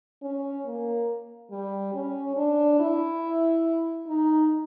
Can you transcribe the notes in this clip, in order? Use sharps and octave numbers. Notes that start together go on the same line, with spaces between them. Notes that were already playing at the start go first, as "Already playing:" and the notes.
C#4
A#3
G3
C#4
D4
E4
D#4